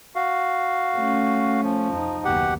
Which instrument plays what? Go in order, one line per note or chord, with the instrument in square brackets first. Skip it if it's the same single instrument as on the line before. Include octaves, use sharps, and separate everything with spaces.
[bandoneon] F#4 F5
[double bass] A3 C#4
[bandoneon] F3
[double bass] F2 D#4
[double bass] F#1 D#2 [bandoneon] B2 G4 F#5